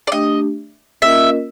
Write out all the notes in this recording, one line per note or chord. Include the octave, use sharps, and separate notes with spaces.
D5
A3 D4 G4 D#5
A#3 C#4 F4 A#4 D#5 E5